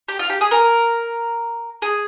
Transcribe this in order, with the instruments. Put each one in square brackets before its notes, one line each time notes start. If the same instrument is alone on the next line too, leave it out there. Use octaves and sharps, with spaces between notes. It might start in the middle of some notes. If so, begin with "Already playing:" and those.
[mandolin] G4
F4
G4
G#4
A#4
G#4